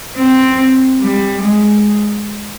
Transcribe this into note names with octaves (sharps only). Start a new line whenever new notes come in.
C4
G3
G#3